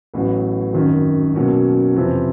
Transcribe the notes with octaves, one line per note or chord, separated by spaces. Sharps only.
A1 A2 F#3 B3
G#1 F#2 D#3
B1 B2 F#3 A#3 C#4
F2 C3 E3